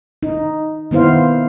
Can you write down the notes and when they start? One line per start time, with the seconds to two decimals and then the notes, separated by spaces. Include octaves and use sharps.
0.23 D#4
0.91 D#3 B3 E4 C5 F5